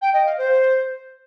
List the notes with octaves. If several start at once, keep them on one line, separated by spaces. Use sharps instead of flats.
G5
D#5
F5
C5